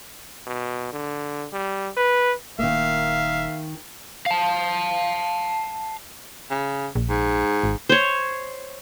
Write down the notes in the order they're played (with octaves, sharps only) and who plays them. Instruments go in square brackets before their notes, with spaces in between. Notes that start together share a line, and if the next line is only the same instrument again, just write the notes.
[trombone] B2
D3
G3
B4
[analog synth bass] D#1 [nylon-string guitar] D#3 A#3 [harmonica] E5 F5
[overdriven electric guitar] F5 A5
[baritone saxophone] C#3
[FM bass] A#1
[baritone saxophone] G#2
[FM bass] G#1
[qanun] C5 C#5